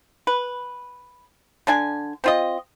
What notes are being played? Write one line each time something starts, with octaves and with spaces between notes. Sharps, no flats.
B4
D3 D4 G#5
C4 F4 D#5